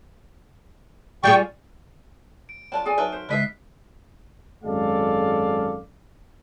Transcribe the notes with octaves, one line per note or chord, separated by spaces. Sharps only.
G3 F4 G#4 G5 C#6
D7
F#3 D4 F4 A5
G#4 D5 G#5
F#3 D#4 B4 E5 A5 F6
C5
C#3 G#3 E4 D#5 E5 F#6 B6 C7
G#1 F#2 G#3 A4 D5 F5